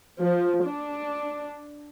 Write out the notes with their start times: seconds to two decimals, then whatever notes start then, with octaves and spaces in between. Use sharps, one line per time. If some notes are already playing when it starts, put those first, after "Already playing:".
0.22 F3
0.65 D4